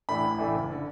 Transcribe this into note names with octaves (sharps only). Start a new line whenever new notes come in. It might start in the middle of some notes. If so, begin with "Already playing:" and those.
A2 E3 A3 D4 B5
A1
A2 E3 A3 D4
F#1
D3